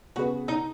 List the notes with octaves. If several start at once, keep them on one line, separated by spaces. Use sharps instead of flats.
C#3 B3 F#4 G#4 B4
D#4